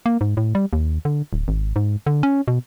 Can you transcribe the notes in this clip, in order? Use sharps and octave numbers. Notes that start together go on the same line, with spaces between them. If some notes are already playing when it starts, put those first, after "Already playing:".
A#3
G#2
A2
G3
D#2
D3
D1
G#1
G#2
D3
C#4
B2